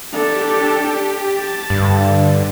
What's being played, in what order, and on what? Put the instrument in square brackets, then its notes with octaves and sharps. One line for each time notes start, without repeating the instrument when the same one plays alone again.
[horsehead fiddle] D4 A4 [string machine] G4
[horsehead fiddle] A5 [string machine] A6
[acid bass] G2 [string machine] D3